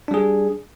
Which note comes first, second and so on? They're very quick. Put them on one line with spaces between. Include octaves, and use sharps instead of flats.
D4 G3 G#4